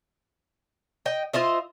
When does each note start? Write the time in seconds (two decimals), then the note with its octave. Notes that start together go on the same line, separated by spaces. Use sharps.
1.06 D#5 G5
1.33 F4 C5 D#5 E5